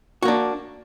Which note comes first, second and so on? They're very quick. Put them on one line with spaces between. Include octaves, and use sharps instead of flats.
F#4 A#3 D4